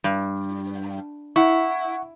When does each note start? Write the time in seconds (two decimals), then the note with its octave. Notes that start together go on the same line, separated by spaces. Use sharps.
0.04 G2
1.36 E4 F#5 C#6